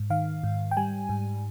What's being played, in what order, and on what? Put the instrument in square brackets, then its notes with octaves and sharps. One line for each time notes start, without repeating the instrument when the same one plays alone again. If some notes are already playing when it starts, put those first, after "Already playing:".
Already playing: [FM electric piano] G#2
D#3 F5
G#2
G5
G3 G#5
G#2